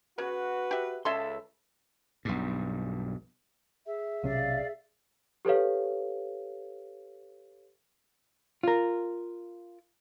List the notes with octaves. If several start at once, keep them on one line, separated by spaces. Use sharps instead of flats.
C#3 F#4 B4
G4 E5
C#2 C#4 A4 E5 C6
B1 G2
G#4 E5
B1 C3 C#4 D5 F5
G4 A4 B4 C#5 F5
F4 A#4